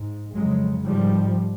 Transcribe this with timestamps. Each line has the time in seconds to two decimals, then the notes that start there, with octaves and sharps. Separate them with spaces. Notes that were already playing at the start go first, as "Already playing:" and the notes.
Already playing: G#2
0.35 F2 C#3 F#3 G#3
0.83 G#2 F3 G3